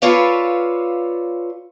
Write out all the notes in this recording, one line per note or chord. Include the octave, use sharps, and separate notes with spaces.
F4 A4 B4 C#5 D5 F5